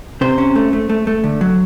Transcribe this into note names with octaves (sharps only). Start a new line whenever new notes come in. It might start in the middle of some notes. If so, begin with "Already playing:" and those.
C3 C5
C#4
A3
A3
A3
A3
D3
F#3